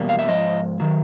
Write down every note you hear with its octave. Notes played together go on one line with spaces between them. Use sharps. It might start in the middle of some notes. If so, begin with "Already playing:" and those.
Already playing: E2 B2 G3 A#3
F5
E5
G#2 F3 D#5
D#3 F#3